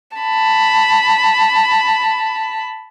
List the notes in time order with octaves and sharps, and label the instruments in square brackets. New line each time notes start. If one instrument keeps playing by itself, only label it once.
[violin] A5 B5